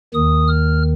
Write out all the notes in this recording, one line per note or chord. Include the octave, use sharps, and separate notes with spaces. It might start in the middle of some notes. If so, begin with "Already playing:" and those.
D#2 D#3 D#6
F6